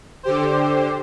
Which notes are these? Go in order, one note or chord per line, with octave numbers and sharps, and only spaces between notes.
D3 G4 C5